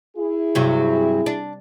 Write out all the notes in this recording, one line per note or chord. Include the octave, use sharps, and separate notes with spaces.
E4 G#4
G2 C3 F#3
D4